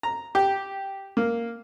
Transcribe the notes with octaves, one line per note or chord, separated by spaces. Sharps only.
A#5
G4
A#3